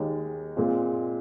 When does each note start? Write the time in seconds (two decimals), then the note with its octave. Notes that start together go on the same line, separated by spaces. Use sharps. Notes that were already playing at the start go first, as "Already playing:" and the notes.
Already playing: D#2 D#3 G#3 D#4
0.56 A#2 G#3 C4 F4